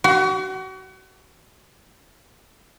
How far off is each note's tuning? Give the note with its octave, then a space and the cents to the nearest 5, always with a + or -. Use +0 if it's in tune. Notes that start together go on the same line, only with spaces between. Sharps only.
F#4 +35